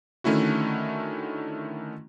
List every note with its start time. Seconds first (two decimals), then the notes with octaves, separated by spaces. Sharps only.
0.24 D3 D#3 A3 C#4 E4 F#4